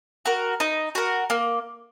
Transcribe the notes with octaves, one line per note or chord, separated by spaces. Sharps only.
F#4 A#4
D#4
F#4 A#4
A#3